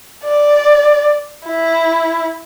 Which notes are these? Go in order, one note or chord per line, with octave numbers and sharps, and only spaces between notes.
D5
E4